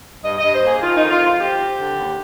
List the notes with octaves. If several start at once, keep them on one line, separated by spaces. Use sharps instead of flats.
G2 D#5
D#5
G2
C5
A#3 G#4
D#3 F4
D#4
F2
F4
F2
F4
C4 G4
C4
D3
D#2